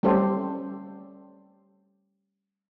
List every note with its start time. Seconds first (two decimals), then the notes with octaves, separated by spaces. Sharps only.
0.03 G3 A3 C#4 G4 A4 C5